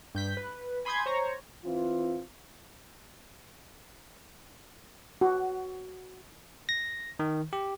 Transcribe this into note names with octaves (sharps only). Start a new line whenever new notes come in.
G2 G6 B6
B4
G#5 B5 C6 D#6 G6 G#6
C5 C#5 A#5 C#6
E3 C4 F4
F#4
A#6
D#3
G4